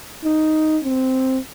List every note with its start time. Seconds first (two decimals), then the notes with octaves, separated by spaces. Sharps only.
0.24 D#4
0.84 C4